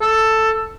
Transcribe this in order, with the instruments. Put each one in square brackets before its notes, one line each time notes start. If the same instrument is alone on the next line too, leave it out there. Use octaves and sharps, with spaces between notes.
[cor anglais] A4